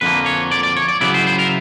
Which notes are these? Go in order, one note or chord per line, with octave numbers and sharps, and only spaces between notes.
F2 D3 F3 A#3 B4
C#5
D5
D5
C#5
D5
C#3 F#3 B3 E4 D5
C5
C5
A#4